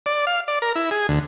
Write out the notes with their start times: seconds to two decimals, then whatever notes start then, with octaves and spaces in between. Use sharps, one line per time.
0.06 D5
0.27 F5
0.48 D5
0.62 A#4
0.76 E4
0.91 G#4
1.09 D2